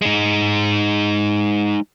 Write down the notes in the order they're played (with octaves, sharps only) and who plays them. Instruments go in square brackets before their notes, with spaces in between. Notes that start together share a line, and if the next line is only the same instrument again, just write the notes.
[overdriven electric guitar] G#3 D#4